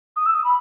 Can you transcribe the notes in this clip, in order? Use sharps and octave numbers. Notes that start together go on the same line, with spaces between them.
D#6
E6
D#6
B5